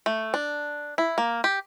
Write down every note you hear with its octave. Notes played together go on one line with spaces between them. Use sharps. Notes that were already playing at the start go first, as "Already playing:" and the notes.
A3
D4
E4
A#3
G4